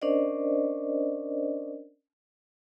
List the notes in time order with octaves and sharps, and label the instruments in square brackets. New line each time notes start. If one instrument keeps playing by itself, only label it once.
[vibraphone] C#4 D4 A#4 C5 D5 D#5